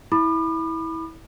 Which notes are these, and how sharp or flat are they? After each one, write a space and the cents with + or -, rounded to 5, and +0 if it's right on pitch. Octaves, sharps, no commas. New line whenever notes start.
E4 -25 B5 +0 D6 +45